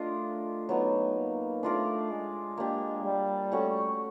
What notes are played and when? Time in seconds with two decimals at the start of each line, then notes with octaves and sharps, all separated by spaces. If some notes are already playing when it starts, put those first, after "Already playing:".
Already playing: A3 D4 F4 A#4 D#5
0.69 F#3 B3 D#4
1.16 A#3
1.63 A3 D4 F4 A#4 D5
2.10 G#3
2.57 A#3 D4 G4
3.05 G3
3.52 A3 C#4 F#4